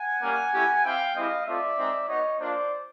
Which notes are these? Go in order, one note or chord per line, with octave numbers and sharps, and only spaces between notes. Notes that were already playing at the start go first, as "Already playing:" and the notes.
Already playing: F#5 G#5
G3 A#3 C#4
A3 C#4 E4 G4
C4 E4 G4 F5 G5
G#3 C4 E4 G4 D#5 F5
A3 C4 F4 D5 E5
G#3 C4 D#4
B3 D#4 F#4 C#5 D#5
A#3 D4 F4 C5 D5